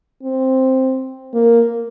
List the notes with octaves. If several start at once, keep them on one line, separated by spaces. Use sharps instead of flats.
C4
A#3